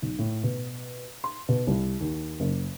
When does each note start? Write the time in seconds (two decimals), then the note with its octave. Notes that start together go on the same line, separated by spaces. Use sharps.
0.02 B1
0.19 A2
0.43 B2
1.24 C6
1.49 B2
1.67 C2
2.00 D#2
2.40 F#1